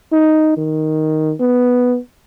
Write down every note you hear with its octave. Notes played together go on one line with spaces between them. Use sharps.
D#4
D#3
B3